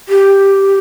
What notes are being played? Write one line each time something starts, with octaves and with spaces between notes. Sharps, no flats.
G4